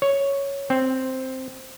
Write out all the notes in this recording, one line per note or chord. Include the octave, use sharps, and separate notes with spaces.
C#5
C4